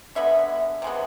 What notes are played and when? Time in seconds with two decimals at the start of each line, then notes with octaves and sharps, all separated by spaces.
0.15 D3 G#3 B3 E5
0.82 C3 G#3 B3